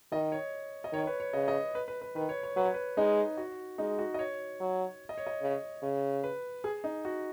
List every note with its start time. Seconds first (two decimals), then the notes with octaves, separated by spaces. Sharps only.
0.12 D#3 D#5
0.32 C#5
0.84 D#5
0.93 D#3 C#5
1.03 C#5
1.07 B4
1.20 C#5
1.33 C#3 D#5
1.48 D#5
1.75 B4
1.88 B4
2.01 B4
2.15 D#3 B4
2.29 C#5
2.43 C#5
2.56 F#3 B4
2.65 C#5
2.74 B4
2.97 G#3 D#4
3.37 F#4
3.78 G#3 D#4
3.99 F#4
4.14 D#5
4.19 C#5
4.60 F#3
5.09 D#5
5.18 C#5
5.27 D#5
5.42 C#3
5.83 C#3
6.24 B4
6.64 G#4
6.84 D#4
7.05 F#4